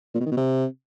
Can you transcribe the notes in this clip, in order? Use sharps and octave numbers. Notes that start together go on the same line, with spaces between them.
A#2
B2
D#3
B2
C3